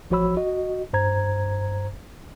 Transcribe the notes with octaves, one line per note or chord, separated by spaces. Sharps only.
A1 F3 F#4 C#5 B5 E6
F#4 D#5
G2 C5 A#5 G#6